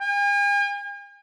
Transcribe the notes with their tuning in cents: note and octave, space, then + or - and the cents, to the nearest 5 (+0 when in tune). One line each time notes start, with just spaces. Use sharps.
G#5 -45